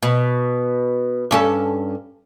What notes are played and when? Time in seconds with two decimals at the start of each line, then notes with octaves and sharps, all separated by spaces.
0.03 B2
1.31 G2 C#4 A4